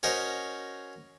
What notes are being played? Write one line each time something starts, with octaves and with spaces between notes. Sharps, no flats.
C#4 F#4 A#4 C5 D#5